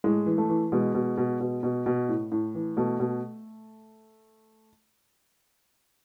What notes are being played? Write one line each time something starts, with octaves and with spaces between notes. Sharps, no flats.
A2 G#3
E3
A3
E3
B2 G#3
B2
B2
B2
B2
B2
A2
A2
E3
B2 A3
B2